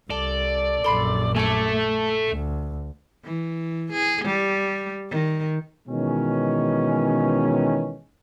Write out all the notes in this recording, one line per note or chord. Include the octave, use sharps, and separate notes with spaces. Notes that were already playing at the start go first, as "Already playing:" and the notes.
C2 A4 D5
A#1 F#2 A4 B5 C6
A3 A4 G#5 D6
D2
E3
G#4
G3
D#3
B2 D#3 E3 G#3 C#4